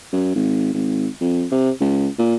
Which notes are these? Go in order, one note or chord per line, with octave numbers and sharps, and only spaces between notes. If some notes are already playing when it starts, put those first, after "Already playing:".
F#2
G#1
G#1
F2
C3
C#2
A#2